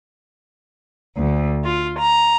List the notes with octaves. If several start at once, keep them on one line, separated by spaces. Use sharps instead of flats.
D2
F4
A#5